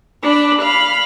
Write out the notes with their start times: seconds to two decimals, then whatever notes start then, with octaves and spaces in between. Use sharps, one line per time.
0.23 D4 B5
0.62 F5 B5